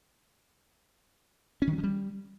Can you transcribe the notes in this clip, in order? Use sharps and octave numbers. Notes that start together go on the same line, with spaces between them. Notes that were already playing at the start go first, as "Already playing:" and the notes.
C#4
D#3
F#3
F3
G3